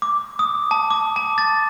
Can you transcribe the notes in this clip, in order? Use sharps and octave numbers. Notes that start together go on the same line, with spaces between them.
D6
D#6
A5
D6
A5
A6